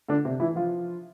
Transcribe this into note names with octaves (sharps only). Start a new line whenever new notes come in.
D3 D4
C3 C4
E3 E4
F3 F4